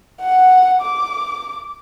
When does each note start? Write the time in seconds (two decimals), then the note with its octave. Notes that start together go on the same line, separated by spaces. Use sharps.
0.22 F#5
0.82 D6